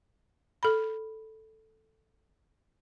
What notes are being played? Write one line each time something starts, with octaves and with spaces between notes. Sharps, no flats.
A4 B5